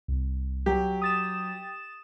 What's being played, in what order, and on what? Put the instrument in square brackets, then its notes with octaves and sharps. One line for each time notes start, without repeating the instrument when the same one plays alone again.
[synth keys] C2
[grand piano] F#3 [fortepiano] G4
[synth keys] D#6 A6 E7